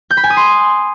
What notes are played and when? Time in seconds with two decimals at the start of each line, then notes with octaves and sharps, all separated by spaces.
0.11 G6
0.17 B5
0.24 G#5
0.30 D#6
0.37 C6